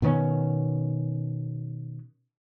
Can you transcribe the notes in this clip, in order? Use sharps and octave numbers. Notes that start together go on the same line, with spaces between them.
B2 D#3 B3 C#4